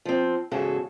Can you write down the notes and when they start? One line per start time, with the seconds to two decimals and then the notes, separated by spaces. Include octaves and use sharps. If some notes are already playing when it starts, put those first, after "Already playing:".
0.05 F3 C4
0.51 E2 G#2 C#3 F#4 G#4 A4